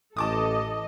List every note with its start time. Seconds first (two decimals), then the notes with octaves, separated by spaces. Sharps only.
0.17 A1 A4 D#5 A5 D6 D#6